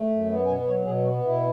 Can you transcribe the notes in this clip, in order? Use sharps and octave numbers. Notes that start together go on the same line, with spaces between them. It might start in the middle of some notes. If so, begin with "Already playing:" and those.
Already playing: A3
F#2
B3
B2 G#5
F#3 C#5
B2 G#4
B3 F#4
B2 E4